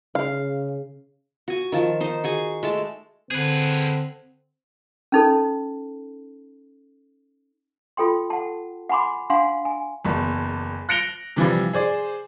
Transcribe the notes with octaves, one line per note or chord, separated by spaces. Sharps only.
C#3 F5
F#4 G#5
D#3 F3 A5
D#4 C5
F#4 G#4 G#5
G#3 A3 A5
D3 C4 G#4 B4
C#4 D#4 A4
F4 A4 G5 C6
F#5 A5
F#5 G#5 B5 C6 D6
D4 F5 F#5 G#5 C6
G#5
F#1 E2
F#6 A#6 C#7 D7 F7 G7
C3 E3 F3 G3
G#4 C5 D5